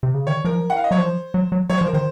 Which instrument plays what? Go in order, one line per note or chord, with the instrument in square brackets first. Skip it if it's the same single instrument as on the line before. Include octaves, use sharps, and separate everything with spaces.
[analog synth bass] C3
C#3
[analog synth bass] D#3 [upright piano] C#5
[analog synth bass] F3 [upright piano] A#4
[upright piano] F#5
F5
D#5
[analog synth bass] F#3 [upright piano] C#5
[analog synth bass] F3 [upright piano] C5
[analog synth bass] F#3
F#3
[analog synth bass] F#3 [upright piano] C#5
[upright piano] C5
[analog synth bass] F3
[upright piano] A#4
[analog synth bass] D#3 [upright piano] C5